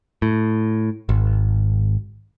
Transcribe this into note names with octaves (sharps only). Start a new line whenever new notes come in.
A2
G#1